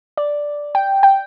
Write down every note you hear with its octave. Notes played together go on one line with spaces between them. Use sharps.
D5
G5
G5